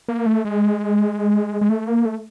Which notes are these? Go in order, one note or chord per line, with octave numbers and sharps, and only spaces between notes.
A#3
A3
G#3
G#3
A3
A#3
A3